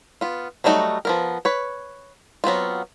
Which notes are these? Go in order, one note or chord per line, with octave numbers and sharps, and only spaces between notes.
B3 F4
F#3 G3 A3 D#4 F#4
F3 B3 A#4
B4 C#5
F#3 B3 C4 F4